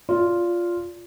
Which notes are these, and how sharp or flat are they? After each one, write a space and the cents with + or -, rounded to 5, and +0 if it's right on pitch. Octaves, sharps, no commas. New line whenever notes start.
F4 +0 D5 -25